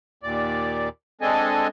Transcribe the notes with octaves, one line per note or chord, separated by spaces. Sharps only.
D#2 A#2 D5
G#3 C4 D4 A4 D#5 G#5